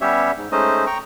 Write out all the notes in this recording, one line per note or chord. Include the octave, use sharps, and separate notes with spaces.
G3 B3 C#4 G4 C#5 E5
G#2
G#3 A3 C#4 D#4 C5 D#5
G5 A#5 C#6